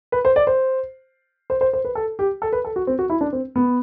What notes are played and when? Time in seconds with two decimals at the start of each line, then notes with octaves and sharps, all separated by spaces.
0.12 B4
0.25 C5
0.36 D5
0.47 C5
1.50 C5
1.61 C5
1.73 C5
1.85 B4
1.95 A4
2.19 G4
2.42 A4
2.52 B4
2.65 A4
2.76 F#4
2.87 C4
2.99 F#4
3.10 E4
3.21 D4
3.33 C4
3.56 B3